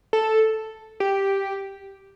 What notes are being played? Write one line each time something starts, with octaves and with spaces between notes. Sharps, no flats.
A4
G4